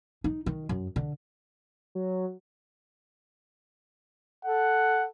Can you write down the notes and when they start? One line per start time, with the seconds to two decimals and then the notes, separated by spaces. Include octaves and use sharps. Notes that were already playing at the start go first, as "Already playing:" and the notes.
0.24 D#4
0.46 D#3
0.69 F#2
0.96 D3
1.95 F#3
4.45 A4 F#5